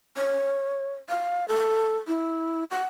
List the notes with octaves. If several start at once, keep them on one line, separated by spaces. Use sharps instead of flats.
C#5
F5
A4
E4
F#5